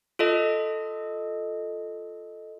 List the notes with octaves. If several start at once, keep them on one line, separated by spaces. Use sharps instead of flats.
F4 A4 D#5